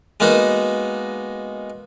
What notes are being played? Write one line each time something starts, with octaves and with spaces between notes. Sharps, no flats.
G#3 A#3 B3 D#4 F#4